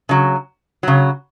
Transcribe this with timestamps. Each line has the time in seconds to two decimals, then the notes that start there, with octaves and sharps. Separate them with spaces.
0.09 C#3 F#3
0.83 C#3 F#3